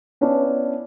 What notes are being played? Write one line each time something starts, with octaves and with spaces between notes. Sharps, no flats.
B3 C#4 D4 E4